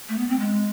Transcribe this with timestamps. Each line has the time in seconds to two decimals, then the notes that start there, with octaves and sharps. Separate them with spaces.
0.09 A3
0.18 B3
0.29 C4
0.39 G#3